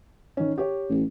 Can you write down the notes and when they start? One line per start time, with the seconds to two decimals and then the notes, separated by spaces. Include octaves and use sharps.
0.37 D#3 C#4
0.58 G4 C#5
0.89 A1